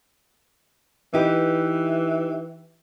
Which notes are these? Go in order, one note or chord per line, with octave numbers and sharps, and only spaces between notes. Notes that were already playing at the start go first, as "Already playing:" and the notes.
E3 D#4 G4 B4